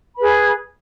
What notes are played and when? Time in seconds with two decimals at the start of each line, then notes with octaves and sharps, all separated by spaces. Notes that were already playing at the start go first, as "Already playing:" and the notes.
0.14 B5
0.18 B4
0.22 G#4